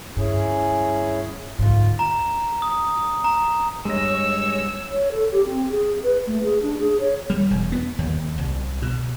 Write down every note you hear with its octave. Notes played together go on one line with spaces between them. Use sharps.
D2 G2 C#4 E4 G#4
D2 G#2 F4
A#5
D#6
A#5
G2 G#3 C#5 D#5 E6
C#5
A4
G4
C4
G#4
B4
A3
G#4
D4
G#4
C#5
G3
E1
B3
D#2
C2
B2